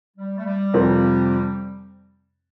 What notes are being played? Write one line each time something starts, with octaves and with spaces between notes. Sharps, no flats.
G3
A3
G3
F2 C3 F3 C4